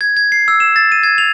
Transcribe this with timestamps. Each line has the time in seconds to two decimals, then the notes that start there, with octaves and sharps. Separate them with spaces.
0.01 G#6
0.17 G#6
0.32 C7
0.48 E6
0.60 E7
0.76 A6
0.92 D#7
1.03 G#6
1.18 F7